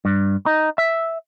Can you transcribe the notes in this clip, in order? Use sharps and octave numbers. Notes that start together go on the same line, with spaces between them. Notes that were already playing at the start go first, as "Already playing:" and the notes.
G2
D#4
E5